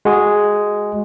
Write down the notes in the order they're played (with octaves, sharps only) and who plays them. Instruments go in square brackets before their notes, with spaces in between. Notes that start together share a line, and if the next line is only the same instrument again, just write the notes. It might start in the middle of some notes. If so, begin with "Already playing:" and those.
[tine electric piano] G#3 F#4 G#4